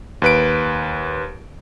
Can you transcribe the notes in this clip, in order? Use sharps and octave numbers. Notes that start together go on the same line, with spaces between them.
D#2 B4 D7